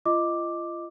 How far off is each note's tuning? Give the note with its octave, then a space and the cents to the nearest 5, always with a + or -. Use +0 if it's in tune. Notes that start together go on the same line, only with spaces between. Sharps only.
F4 -30 D#5 +0 D6 +0